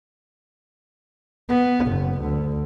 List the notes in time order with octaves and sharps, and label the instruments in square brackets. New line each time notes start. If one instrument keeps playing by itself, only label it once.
[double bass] B3
F#1
D2